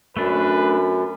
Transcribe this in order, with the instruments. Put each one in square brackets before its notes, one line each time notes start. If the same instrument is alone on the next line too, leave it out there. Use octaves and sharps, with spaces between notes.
[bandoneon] F#2 [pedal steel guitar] A3 D4 [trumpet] B4